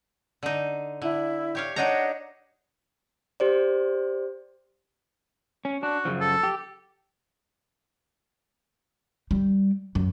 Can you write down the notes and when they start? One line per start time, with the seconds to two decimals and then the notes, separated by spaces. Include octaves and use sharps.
0.43 D3 D#4
1.02 D3 E4
1.55 G4 C#5 F5
1.76 D4 D#4 C#5 D#5 F#5 A#5
3.40 G4 C5 D5
5.65 C#4
5.83 D4 F#4
6.05 F#2 C#3 F3
6.21 A4
6.43 G4
9.31 G3
9.95 F#2